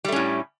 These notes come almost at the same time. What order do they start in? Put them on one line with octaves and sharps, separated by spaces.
G3 A3 C#4 A2